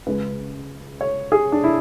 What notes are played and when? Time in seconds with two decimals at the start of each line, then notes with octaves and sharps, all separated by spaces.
0.06 C#2 C#3 G#3 B4
1.01 C#5
1.32 G#4
1.52 D4
1.64 E4